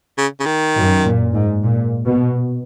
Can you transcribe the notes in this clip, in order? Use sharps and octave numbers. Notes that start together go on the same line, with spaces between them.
C#3
C#3
D#3
F#2
A#2
G#2
A#2
B2